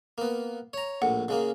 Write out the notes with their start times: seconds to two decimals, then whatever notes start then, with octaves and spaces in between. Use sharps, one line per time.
0.18 A#3 B3
0.73 C#5 A#5
1.02 A#1 A2 F#5
1.28 C#3 G#3 A#3